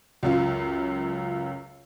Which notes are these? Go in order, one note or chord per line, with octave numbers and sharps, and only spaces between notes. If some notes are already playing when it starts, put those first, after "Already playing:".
C#2 F#2 F4